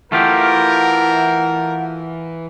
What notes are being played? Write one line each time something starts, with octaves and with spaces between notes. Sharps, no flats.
E3 A3 F4 G4 A#4 F#5